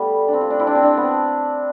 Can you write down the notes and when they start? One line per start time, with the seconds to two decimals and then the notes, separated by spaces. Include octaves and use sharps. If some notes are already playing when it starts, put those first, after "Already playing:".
Already playing: G3 A3 B3
0.28 D4
0.33 C4
0.41 F4
0.50 D4
0.60 E4
0.67 D4
0.75 C4
0.83 D4
0.97 B3
1.03 C4